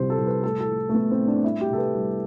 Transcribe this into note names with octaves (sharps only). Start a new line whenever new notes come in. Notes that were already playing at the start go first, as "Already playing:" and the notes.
Already playing: C2 C3 F3 C5
A4
C2
B4
A2 A4
A4
F3
A3
F3 B3
C4
A2
D4
G3 E4
G4
C3 A4
B4
C2